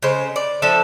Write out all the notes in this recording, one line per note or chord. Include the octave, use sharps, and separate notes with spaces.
C#3 G#3 C5
D5
F3 D4 A4 E5